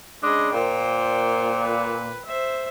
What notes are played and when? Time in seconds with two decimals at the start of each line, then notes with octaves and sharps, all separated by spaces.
0.23 C#3 G#3 D4 D#5
0.52 A#2 C5 G5
1.64 B4
2.25 C5 E5